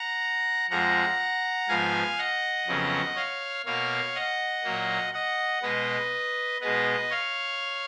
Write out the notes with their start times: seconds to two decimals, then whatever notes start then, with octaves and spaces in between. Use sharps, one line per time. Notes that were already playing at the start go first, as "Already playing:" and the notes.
Already playing: F#5 A#5
0.70 F2 F3 G#3 F#5 A#5
1.69 G#2 F3 B3 F5 G#5
2.18 D#5 F#5
2.67 F2 C#3 F#3 B3
3.16 C#5 F5
3.66 B2 A#3 C#5 F5
4.15 D#5 F#5
4.64 A#2 F#3 A#3
5.13 D#5 F#5
5.62 B2 G#3 B3 B4 D#5
6.61 B2 G#3 B3 B4 D#5
7.10 C#5 F5